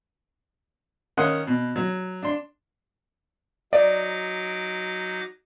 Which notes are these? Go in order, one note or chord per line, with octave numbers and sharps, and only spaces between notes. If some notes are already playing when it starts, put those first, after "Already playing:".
D#3 C#4 F#5 C6 D#6
B2
F#3
D4 C6
F#3 D#4 D5 D6